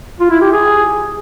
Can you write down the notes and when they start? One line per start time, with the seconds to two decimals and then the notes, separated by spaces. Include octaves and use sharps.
0.20 F4
0.31 E4
0.41 G4
0.52 G#4